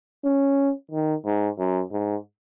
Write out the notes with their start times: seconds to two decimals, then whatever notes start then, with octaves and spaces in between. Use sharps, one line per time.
0.24 C#4
0.91 D#3
1.25 G#2
1.58 F#2
1.92 G#2